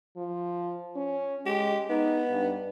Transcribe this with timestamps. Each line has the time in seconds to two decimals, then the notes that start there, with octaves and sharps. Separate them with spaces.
0.17 F3
0.95 C#4
1.46 G#3 G4
1.89 B3 D#4
2.30 G2